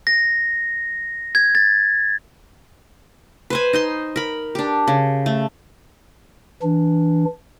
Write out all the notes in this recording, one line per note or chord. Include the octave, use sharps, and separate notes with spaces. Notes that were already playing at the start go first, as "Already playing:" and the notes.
A#6
G#6
A6
B4 C5 G#5
D#4 D#5 C6
A#4 B5
D4 G4
C#3
A3
E3 D4